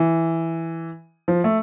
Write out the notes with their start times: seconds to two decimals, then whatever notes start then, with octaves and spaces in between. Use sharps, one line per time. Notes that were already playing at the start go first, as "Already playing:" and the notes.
Already playing: E3
1.28 F3
1.44 A3